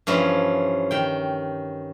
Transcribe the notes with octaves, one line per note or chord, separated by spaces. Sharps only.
G2 E3 F3 C#4
D#3 G5